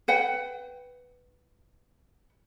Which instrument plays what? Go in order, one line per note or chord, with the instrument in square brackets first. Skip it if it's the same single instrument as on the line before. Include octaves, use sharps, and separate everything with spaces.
[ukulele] B4 F#5 G5